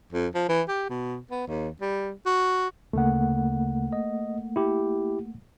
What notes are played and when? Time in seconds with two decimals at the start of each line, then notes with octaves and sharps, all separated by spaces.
0.12 F2
0.34 F3
0.49 E3
0.68 G4
0.90 B2
1.31 B3
1.47 D#2
1.81 G3
2.26 F#4
2.93 D2 C#3 A3 A#3 F#5
3.93 D#5
4.56 E4 G4